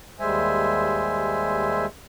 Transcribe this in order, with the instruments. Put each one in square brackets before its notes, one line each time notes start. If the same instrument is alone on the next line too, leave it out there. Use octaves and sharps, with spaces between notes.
[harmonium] D#2 G3 G#3 C5 E5 G#5